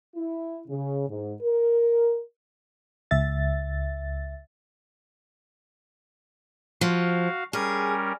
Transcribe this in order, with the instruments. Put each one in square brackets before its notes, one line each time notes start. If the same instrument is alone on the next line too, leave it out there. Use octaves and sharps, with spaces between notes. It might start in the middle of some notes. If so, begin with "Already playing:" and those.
[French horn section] E4
C#3
G#2
A#4
[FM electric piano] C#2 E5 A6
[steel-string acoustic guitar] F3 [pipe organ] F#4 F5
[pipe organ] G3 C#4 A#4 [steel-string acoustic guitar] G#4